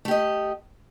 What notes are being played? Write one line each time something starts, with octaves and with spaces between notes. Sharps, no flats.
A3 G4 D#5